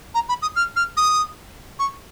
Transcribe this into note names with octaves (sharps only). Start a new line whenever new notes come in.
A#5
B5
D#6
F6
F6
D#6
C#6